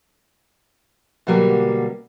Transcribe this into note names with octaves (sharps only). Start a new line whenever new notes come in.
B2 D3 F#3 G3 A#3 G4